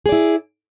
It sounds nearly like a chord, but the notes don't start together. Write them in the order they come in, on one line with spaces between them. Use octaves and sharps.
G#4 D5 E4